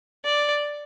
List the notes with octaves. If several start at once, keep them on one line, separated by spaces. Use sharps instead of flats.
D5